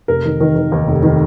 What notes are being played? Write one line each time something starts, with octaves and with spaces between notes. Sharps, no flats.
F1 A#4
D#3
D#3
D#3
D#2
F1
D#3